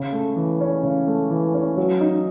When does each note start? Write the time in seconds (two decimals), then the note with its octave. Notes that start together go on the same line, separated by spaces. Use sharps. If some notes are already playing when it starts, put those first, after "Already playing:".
Already playing: C#3
0.13 A3
0.36 E3
0.61 C#4
0.83 C#3
1.07 A3
1.30 E3
1.54 C#4
1.77 F#3
2.01 D#4